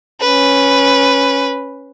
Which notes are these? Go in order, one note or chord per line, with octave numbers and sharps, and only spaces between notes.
C#4 B4